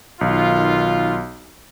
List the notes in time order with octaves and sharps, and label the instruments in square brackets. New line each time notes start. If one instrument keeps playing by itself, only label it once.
[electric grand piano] B1 [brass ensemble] D#3 F4